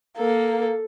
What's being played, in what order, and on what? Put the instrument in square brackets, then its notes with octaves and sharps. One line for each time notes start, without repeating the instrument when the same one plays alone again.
[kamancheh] A#3 [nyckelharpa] A4